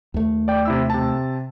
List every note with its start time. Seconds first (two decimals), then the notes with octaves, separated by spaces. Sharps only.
0.14 D#2 A3
0.48 D5 G5
0.65 C3 E4 E6
0.90 C3 A5